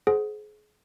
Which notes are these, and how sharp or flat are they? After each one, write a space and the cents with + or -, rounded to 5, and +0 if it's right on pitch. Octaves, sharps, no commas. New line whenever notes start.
G#4 +30 C5 +0 F#5 +0